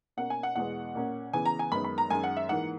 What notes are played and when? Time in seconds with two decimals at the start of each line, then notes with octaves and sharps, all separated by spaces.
0.17 B2 A#3 C#4 F#5
0.30 G#5
0.43 F#5
0.55 E2 B2 G#3 B3 F#5
0.95 A#2 A#3 C#4
1.33 C#3 E3 B3 G#5
1.45 A#5
1.59 G#5
1.72 F#2 D#3 G#3 B3 B5
1.84 B5
1.98 A#5
2.10 F#2 D#3 G#3 C#4 G#5
2.24 F#5
2.37 E5
2.49 G#2 E3 A#3 F#5